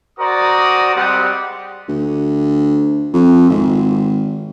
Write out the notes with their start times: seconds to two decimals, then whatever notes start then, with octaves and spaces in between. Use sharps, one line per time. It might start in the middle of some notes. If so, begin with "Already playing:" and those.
0.19 F#4 A#4 C5 D5 A#5 D#6
0.94 G3 G#3 C4 G4 F#5 D#6
1.88 D2
3.13 F2
3.50 G#1